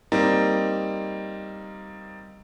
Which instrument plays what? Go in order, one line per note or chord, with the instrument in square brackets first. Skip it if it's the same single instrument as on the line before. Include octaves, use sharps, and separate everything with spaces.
[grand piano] G3 A#3 C4 D#4